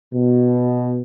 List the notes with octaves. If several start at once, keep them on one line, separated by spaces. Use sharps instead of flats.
B2